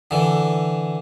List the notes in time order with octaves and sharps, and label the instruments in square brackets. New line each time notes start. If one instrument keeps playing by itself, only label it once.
[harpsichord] D3 E3